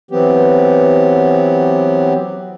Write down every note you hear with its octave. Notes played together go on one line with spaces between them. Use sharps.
E3 F#3 B3 C4 G4